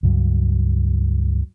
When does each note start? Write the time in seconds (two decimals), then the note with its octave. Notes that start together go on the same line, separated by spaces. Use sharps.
0.03 C#2 G2 F#3